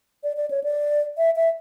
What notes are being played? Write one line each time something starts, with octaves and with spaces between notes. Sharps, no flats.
D5
D5
C#5
D5
E5
E5